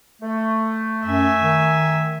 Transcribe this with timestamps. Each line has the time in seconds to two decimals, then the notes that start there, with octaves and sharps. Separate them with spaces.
0.22 A3
1.05 F#2 E5 G#5
1.41 D#3